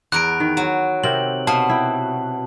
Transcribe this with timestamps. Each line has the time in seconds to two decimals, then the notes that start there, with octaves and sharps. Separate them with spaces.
0.12 E2 A#4 F#6 D7
0.40 D#3
0.57 F#3
1.04 C3 C4 A#4 F#7
1.47 B2 F5 A5
1.70 E4 G5